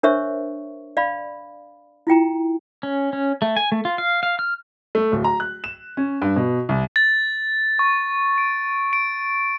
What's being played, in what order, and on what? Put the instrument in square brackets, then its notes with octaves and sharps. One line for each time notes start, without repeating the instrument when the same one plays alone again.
[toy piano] D4 A#4 C5 C#5 E5 C#6
D5 F5 B5
E4 F4 G5 A#5
[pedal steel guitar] C#4
C#4
A3
G#5
A3
F4
F5
F5
F6
[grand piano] A3
D1
A#5
F#6
E7
C#4
G2
B2
C2
[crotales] A6
C#6
D7
D7